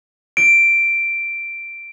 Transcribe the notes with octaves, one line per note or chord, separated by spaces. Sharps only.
D7